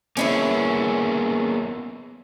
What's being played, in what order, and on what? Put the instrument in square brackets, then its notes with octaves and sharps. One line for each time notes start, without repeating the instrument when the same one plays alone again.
[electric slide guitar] A#3 B3 G#4 [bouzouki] C#4 D#4 E4